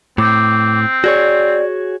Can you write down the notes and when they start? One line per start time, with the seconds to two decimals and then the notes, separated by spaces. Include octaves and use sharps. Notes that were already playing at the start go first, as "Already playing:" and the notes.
0.18 A2 C4 D6
1.04 F#4 G#4 C#5 D5